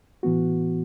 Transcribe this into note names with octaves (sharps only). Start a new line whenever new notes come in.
A2 E3 B3 F#4